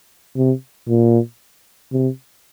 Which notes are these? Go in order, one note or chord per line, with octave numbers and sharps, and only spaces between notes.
C3
A#2
C3